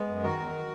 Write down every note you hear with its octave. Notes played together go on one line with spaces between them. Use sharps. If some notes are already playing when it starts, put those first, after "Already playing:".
Already playing: G#3 B3
F#2
D#3 F#4 A#4
E2